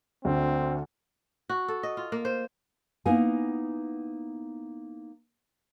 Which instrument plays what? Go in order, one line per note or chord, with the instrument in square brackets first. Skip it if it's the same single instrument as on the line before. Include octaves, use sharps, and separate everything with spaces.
[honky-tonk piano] D2 [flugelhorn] C4
[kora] F#4
A4
D#5
F4
A#3
C5
[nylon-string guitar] A#3 B3 D#4 E4 G#5